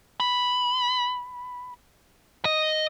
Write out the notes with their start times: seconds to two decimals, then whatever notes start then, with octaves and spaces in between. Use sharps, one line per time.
0.20 B5
2.45 D#5